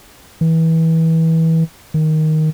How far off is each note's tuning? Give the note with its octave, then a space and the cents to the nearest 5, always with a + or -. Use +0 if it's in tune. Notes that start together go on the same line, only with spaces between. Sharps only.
E3 -25
D#3 +5